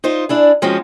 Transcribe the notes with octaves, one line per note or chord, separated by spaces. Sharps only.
D#4 F4 C5
D4 E4 G#4
F3 G#3 C4 C#4 F#4